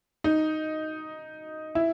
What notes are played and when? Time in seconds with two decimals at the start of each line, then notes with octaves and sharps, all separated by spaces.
0.24 D#4
1.75 E4